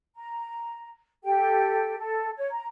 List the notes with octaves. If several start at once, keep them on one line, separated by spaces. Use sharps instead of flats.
A#5
G4 A4 G5
A4
C#5
A#5